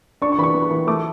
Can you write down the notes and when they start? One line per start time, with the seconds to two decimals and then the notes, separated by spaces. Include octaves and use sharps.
0.22 D4 C#6
0.32 C#6
0.38 E3 B5
0.44 C#6
0.54 B3
0.71 E3
0.87 A3 D6